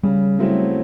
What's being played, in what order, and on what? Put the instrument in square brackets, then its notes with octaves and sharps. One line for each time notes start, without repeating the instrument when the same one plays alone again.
[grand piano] C#3 [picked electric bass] G3
[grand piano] F#3 A3 C4 E4